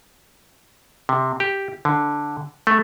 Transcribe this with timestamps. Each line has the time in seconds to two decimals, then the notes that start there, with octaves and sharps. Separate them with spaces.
1.09 C3
1.40 G4
1.85 D3
2.67 A3